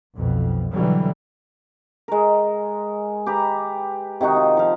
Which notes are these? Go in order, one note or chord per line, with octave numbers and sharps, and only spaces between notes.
B1 F2 B2
B2 D3 E3 F#3 G3
G#3 A#4
G4 B4 A#5
C3 D#3 D#4 F#4
D#3 F4
F3 F5